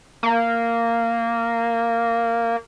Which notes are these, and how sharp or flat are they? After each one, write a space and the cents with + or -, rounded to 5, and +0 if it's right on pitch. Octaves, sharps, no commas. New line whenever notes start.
A#3 -10